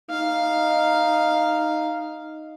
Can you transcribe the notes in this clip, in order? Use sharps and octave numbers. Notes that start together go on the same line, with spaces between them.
D#4 F5